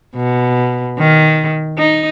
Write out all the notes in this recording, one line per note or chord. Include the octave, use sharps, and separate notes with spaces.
B2
D#3
D#4